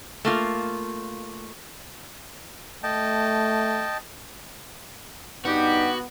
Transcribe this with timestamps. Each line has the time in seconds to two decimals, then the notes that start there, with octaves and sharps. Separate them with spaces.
0.25 A3 A#3 F4
2.83 A3 D#5 G5 A5
5.45 G2 B3 D#4 F#4 G4